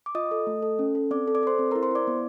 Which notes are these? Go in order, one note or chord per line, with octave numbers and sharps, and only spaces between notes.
D6
F4 D#5 D#6
A4
A3
A4
C#4
A4
C4 D5 D6
A4
D5 D6
A4 C5 C6
C4
A#4 A#5
E4
C5 C6
E4 D5 D6
B3